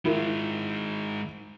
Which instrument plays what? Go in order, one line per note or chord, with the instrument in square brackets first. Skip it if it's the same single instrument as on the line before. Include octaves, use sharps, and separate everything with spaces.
[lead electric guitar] D#3 G#3 [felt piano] E4 F4 A#4